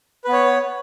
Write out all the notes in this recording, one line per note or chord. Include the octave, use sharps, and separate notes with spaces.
B3 B4 C#5